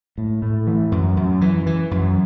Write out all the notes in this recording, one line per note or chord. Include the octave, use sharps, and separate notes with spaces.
A2
A2
E3
F#2
F#2
E3
E3
F#2